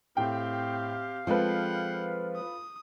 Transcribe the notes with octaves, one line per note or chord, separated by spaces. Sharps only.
A2 C4 G4 F5 G5
F3 G#3 C4 F4 A4 B4 F#5 G5
D#6